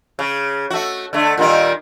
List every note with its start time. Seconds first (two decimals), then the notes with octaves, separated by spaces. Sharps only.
0.19 C#3
0.70 A3 F#4
1.13 D3 A3
1.38 A#2 D#3 G3